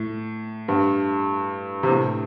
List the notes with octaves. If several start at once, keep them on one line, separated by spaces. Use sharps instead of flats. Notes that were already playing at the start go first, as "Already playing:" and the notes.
Already playing: A2
G2
C3
A2